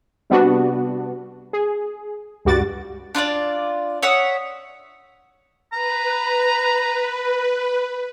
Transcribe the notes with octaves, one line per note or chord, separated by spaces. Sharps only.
C3 G3 B3 D4 F#4
G#4
C#2 G2 G3 F#4 D6 A6
D4 F4 B4 D5
C#5 E5 F#5 D#6
B4 A#5